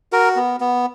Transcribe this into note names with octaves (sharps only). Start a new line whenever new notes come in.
F#4 A#4
B3
B3